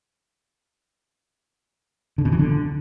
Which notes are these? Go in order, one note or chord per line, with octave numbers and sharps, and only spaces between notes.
D3
B2
E3
D3